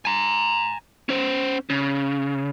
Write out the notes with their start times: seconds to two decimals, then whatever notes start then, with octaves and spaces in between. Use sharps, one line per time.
0.05 G#5 A#5
1.09 C#4 C5
1.70 C#3